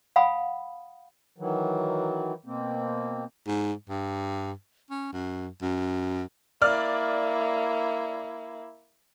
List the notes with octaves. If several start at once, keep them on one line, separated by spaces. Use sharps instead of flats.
F5 F#5 G#5 B5 D#6
D#3 E3 F#3
B2 A#3 C4
G#2
G2
C#4
F#2
F#2
A#3 E4 D5 F6